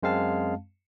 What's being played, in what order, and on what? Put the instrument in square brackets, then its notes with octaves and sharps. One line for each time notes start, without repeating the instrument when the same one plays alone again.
[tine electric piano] F#2 G#3 C4 F5 A5